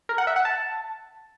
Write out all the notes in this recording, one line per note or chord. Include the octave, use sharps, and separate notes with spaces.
A#4
F#5
E5
F#5
A5